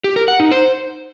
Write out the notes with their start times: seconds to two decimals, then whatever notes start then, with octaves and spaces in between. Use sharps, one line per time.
0.04 G4
0.16 A#4
0.28 F#5
0.40 D#4
0.52 C5